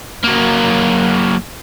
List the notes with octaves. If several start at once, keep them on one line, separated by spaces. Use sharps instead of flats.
F#3 A#3